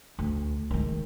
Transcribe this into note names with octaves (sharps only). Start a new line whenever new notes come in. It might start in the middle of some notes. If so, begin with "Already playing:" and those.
D2
D#3 G#3